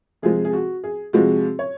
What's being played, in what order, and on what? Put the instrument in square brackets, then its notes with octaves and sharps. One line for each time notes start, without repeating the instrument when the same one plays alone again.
[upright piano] C3 F3 G#3 G#4
G#4
F#4
G#4
C3 F3 G#3 F#4
C#5